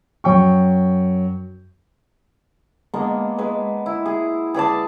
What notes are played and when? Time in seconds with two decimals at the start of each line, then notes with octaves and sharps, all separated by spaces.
0.24 F#2 F#3 G5 C#6
2.94 G#3 A#3 B3 D4
3.38 G#3 B4
3.86 E4
4.05 G#4
4.54 G#4 B4 D5 A5